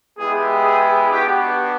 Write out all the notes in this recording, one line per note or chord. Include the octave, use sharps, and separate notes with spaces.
G#3 B3 E4 G4 G#4
G#4
B3 D4 F#4 G4